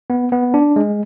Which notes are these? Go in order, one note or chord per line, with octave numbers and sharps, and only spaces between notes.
B3
B3
D4
G#3